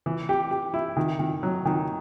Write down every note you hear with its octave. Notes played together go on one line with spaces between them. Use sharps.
E3
G4
G4
E4
D#3
D#3
F#3
D#3